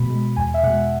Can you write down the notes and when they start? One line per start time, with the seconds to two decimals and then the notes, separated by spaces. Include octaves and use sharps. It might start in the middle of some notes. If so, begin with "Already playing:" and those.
Already playing: B2 G#3 B5
0.10 G#3
0.36 E2 G#5
0.54 E5
0.63 B2 G#3 F#5